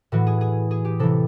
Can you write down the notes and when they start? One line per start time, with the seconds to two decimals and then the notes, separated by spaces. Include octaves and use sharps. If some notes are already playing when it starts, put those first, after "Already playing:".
0.12 A2 E3 F#4
0.27 G#4
0.41 G#4
0.71 G#4
0.85 G4
1.00 C3 E3 A4